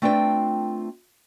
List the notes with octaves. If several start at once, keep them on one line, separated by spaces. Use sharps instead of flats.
A3 C4 D4 F4 B4 G5